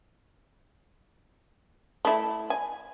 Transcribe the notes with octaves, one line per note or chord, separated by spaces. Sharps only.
A3 E4
G#5